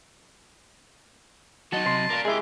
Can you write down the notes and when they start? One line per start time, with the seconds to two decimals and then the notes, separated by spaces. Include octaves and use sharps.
1.72 F#3 D#4 F#4 D#5 A5
1.86 C3 C6
2.10 A#4 D5 F5
2.25 G#3 E4 G#4 G5